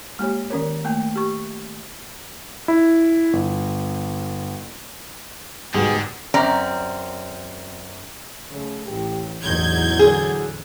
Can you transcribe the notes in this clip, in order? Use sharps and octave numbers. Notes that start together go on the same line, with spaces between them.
G#3 A#3 G4 C#5
D#3 C#4 A#4 C#5
A3 A#3 G5
G4 C#6
E4
G1
G#2 B2 D3 G#3 F#4 G4
F#2 C4 C#4 D5 A#5
C#3 A3
A1 A2 G4
A1 E2 F#3 D#4 G6 G#6
D3 G#4